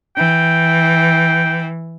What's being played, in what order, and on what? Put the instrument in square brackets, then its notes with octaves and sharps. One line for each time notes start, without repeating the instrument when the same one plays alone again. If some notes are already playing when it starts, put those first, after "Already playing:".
[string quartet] E3 [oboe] G5